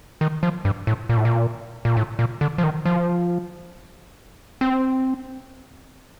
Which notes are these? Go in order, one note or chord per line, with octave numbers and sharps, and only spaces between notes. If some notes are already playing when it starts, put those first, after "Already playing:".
D#3
F3
G2
A2
A#2
A2
A#2
A#2
A2
A#2
D3
F3
D#3
F3
C4